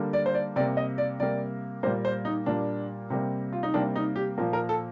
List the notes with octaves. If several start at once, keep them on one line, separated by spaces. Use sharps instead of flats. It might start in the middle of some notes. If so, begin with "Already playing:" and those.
Already playing: D3 G3 A#3
D5
C5
D5
C3 G3 A#3 D5
D#5
D5
C3 G3 A#3 D5
A#2 G3 A#3 C5
C5
D#4
A#2 G3 A#3 D4
C3 G3 A#3
F4
D#4
C3 G3 A#3 D4
D#4
G4
A#2 F3 A#3
A#4
A4